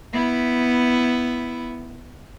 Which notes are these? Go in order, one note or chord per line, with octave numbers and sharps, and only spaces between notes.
B3 E4